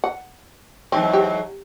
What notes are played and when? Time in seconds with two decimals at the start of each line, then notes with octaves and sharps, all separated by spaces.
0.04 F#5
0.92 E2 G#2 F#3 C4
1.13 G4